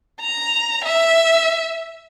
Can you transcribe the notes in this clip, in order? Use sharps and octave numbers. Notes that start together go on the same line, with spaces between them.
A#5
E5